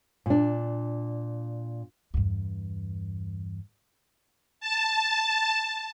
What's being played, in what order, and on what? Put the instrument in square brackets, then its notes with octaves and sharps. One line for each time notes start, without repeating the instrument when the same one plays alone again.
[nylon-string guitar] A#2 D4
[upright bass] E2 G2
[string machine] A5